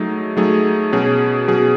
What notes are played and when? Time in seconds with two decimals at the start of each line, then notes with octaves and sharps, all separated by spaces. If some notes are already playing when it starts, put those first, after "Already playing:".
Already playing: F#3 A3 D#4 G#4
0.37 F#3 A3 D#4 G#4
0.92 B2 F#3 C#4 G#4
1.48 B2 F#3 C#4 G#4